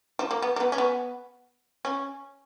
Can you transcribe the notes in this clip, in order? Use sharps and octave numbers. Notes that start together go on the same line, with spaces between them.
F3
A#3
B3
A#3
B3
C#4
B3
C#4